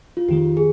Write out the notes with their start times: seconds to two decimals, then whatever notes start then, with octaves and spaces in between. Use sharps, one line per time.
0.17 F4
0.28 F2 D#3 G#3 G4
0.57 G#4